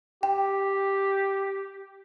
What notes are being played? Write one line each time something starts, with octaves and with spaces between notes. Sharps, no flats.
G4 G5